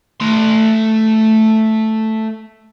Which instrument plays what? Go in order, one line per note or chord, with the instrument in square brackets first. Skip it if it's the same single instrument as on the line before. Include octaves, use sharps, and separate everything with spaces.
[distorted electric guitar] A3 C6